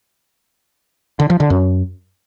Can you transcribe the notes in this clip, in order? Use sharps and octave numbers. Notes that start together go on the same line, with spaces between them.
D3
F3
D3
F#2